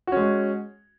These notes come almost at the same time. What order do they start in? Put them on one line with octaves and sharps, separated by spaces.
F#4 C#4 G#3